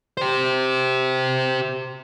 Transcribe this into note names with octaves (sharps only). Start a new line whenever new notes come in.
G4 C5